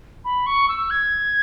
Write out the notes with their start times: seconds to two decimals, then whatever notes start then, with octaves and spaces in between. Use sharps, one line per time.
0.25 B5
0.46 C#6
0.69 E6
0.90 G#6